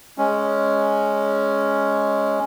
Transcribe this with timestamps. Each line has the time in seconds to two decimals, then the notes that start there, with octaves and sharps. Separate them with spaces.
0.18 G#3 C#4